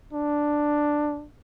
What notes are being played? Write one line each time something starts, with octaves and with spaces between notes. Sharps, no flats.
D4